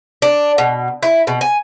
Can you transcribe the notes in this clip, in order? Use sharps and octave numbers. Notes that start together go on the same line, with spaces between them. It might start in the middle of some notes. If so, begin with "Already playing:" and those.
D4
B2
E4
B2
G#5